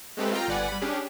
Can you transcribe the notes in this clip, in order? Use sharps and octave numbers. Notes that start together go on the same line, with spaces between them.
G#3 A3 C4 G4 A4 B4
F4 G5 A#5 F6
G1 B4 D5 F#5 G#5
G3 B5
C#4 D4 G4 G#4